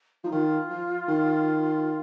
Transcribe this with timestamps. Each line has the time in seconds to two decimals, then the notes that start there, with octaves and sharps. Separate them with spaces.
0.24 F3 D#4
0.31 D#3 F4
0.70 F3
1.08 D#3